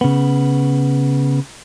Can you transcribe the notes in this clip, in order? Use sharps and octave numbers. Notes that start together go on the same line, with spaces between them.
C#3 B3